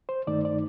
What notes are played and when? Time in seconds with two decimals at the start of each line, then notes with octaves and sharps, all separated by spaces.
0.09 C5
0.27 G2 D#3 A3 D#4 D5
0.45 D5